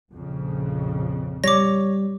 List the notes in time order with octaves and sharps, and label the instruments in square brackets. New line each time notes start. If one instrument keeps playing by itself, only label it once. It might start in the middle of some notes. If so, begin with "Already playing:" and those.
[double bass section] A#1 F2 C#3
[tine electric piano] G3 [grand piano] C#5 [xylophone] D6 A#6